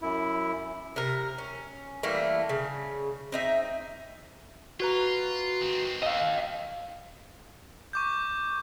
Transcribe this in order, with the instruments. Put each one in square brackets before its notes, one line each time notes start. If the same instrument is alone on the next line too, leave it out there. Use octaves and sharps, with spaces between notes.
[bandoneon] F#2 E4
[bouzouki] C3 A#4
C#4
E3 G3 A3 A#3
C#3
C4 D#4 E5
[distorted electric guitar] F4 [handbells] F#4 B4 A#5
[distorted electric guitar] D#3 C4
[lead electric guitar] D#5 F5
[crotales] C#6 D6 G6